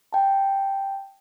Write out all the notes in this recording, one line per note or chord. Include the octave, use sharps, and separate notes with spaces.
G5 A5